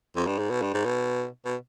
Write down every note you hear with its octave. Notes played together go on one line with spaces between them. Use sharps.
F2
G2
G#2
B2
G2
G#2
B2
B2